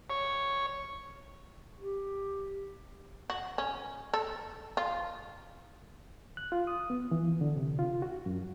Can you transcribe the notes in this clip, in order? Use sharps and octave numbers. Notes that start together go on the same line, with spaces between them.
C#5
G4
F#4
C#4
A4
F4
F#6
F4
D#6
B3
E3
D3
C3
F4
F#4
F#2